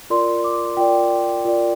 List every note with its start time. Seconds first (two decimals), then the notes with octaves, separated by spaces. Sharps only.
0.10 F4 A#4 D5 C6
0.44 D6
0.77 F4 A#4 D5 G5
1.45 F4 A#4 D5